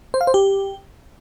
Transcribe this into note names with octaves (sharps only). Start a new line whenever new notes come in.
C5
F5
C5
G4